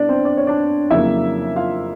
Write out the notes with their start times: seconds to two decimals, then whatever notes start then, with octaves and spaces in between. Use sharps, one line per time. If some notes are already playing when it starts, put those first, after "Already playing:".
Already playing: B2 G3 B3 D4 E4 D5
0.09 C4 C5
0.25 D5
0.37 C#5
0.47 D4 D5
0.91 F2 C#3 F#3 A#3 E4 E5
1.56 F4 F5